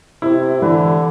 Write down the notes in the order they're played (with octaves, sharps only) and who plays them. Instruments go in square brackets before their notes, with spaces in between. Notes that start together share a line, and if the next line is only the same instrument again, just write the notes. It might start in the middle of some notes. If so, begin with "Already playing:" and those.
[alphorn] C3 [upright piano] E4
[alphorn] D3 [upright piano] E3